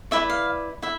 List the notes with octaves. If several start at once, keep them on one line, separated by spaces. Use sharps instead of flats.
E4 B4 D5 E5
F5
E4 E5